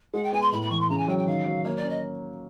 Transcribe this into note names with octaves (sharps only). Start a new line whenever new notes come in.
G#3 F#5
G5
B3 G#5
C6
A2 B5
B5
E3 C#6
C6
C#3 A#5
G#5
F#3 G5
G5
D#3 F5
F#3
A#3 C#5
D5
C#4
D#5